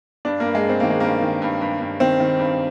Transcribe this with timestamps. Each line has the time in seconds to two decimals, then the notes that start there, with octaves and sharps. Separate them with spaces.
0.25 G2 D4
0.40 A#3
0.45 G2
0.55 G#3
0.65 G2 C4
0.80 D#3 A#3
0.90 G#3
1.00 G2 A#3
1.22 D#3
1.42 G2
1.62 G2
1.81 G2
2.00 D#3 C4
2.20 D#3
2.39 G2